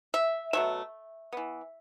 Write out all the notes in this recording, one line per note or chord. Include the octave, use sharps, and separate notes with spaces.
E5
B2 F#3 A3 E5
E3 B3